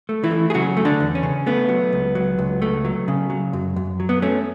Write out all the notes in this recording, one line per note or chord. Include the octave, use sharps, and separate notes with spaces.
A3
E3 E4
A3
G#4
C#3 F#3 F#4
A3
D3 D4
E2
C#4
C#3
A3 B3
F#3
C#2
F#3
C#2
A3
F#3
C#3
F#3
F#2
F#2
F#3
B3
A3 C#4